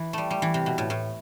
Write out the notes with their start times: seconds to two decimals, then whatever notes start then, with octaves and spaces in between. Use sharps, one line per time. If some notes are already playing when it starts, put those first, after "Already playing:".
Already playing: E3
0.13 G3 A3
0.31 G3
0.42 E3
0.54 C3
0.66 B2
0.78 A2
0.90 A2